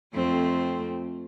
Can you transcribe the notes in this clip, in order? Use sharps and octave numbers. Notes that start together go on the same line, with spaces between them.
F2 A3 C4